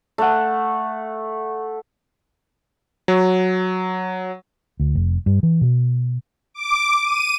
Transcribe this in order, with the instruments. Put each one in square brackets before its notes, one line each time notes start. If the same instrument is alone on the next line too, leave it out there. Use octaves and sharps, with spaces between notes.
[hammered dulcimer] A3 F#5
[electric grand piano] F#3
[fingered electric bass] D2
F1
G2
E3
B2
[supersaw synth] D6
D#7